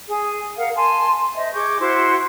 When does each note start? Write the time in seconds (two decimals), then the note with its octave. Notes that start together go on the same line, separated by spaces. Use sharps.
0.09 G#4
0.58 A#4 F5 F#5
0.75 G#5 A5 C6
1.35 C5 D#5 E5
1.53 G#4 C#6 D6 G6
1.79 E4 F#4 C5 C6